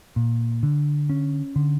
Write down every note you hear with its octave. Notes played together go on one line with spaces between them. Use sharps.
A#2
D3
C#4
D3